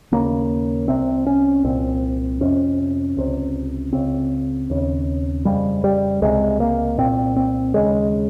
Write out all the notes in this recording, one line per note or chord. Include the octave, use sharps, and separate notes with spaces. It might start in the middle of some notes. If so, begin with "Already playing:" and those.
D#2 C#3 A#3
C2 C3 C4
C#4
C2 A#2 C4
F2 C3 C#4
C#2 C3
C#2 C#3 C4
D#2 C#3
F2 C#3 G3
G3
C#2 C3 G#3
A#3
C2 A#2 C4
C4
D#2 C#3 G#3